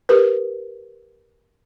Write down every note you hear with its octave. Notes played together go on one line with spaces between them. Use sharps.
G4 A#4 B4